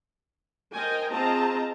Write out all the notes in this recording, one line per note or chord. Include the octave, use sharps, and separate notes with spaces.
A#4 C5 D#5 G5 G#5
C4 F4 G#4 D#5 A5 A#5